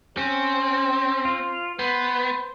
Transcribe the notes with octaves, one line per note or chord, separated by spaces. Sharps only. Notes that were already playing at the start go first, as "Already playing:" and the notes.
C4 C#4 C5
F4
B3 B4 C5